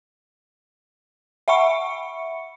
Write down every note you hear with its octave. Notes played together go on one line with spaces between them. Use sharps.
E5 F#5 B5 C#6 C#7